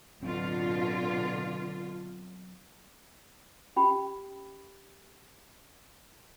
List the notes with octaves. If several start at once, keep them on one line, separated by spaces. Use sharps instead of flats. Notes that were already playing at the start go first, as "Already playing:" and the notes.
B2 D3 F#3 C4 F4
C#4 G4 G5 B5